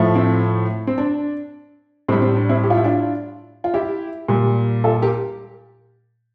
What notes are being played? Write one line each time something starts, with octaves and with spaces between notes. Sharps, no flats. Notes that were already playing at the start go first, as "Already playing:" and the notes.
Already playing: A2 F3 A3
C4 E4
C4
D4
A2 G3 C4
C4
D4
C4 E4
G4
F4
E4
D4 F4
F4
E4 G4
A#2 G3
F4 A4
G4 A#4